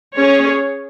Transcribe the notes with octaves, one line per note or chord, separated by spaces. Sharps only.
C#4 G#4 C#5